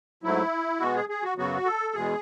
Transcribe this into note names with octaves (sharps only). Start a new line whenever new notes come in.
G#2 F#3 A3 E4
B2 G#3 B3 F#4
G#4
G#4
F#4
F#2 C#3 F#3 B3 F#4
A4
E2 B2 G#3 B3 G#4